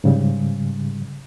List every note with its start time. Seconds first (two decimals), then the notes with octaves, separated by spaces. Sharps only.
0.04 G#2 C#3 G3